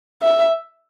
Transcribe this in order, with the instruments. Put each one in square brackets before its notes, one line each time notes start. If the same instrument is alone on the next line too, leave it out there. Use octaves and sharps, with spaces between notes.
[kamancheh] E5